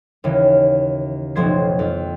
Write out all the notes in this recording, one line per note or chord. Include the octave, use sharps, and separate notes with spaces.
D#2 C#3 E3
F1 B1 F3 C5 G#6 C7
F2